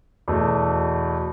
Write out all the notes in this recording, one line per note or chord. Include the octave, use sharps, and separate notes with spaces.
E2 B2 A3